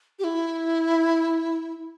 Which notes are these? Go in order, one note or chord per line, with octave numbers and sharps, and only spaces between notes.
G4
E4